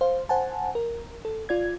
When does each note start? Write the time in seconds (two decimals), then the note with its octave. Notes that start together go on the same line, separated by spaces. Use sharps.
0.01 C5 F5
0.29 C5 F#5 G#5 A5
0.75 A#4
1.25 A4
1.49 F4 D5 G#6